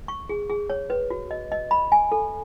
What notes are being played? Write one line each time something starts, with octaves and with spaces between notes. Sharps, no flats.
C#6
G#4
G#4
C#5
B4
F#4
D#5
D#5
B5
G#5
A4